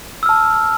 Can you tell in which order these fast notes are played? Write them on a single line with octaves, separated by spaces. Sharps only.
E6 F6 A5